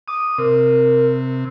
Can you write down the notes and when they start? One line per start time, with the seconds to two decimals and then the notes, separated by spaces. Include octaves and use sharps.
0.08 D6 D#6
0.38 C3 A#4